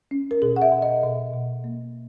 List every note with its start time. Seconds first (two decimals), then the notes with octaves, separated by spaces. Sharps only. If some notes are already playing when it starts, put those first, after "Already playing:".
0.11 C#4
0.31 A#4
0.42 B2 G#4
0.56 F#5
0.62 E5
0.72 B2
0.82 D#5
1.03 B2
1.33 B2
1.64 A#3